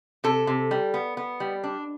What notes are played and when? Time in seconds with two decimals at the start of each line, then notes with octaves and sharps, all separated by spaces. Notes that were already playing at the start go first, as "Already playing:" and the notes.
0.24 C3 A4
0.47 C3
0.71 G3
0.94 B3
1.17 B3
1.40 G3
1.64 D4